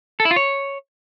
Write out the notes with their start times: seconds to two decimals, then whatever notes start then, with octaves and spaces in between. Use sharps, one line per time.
0.20 A4
0.25 E4
0.31 F4
0.36 C#5